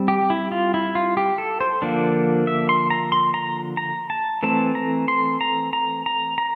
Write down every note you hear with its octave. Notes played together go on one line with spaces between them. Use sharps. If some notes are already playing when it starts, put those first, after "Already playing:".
Already playing: G3 C4
G4
E4
F4
E4
F4
G4
A4
C5
D3 F3 A#3 D4
E5
C6
A#5
C6
A#5
A#5
A5
E3 A3 C4 A5
A#5
C6
A#5
A#5
A#5
A#5